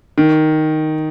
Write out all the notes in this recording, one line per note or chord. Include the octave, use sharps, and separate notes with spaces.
D#3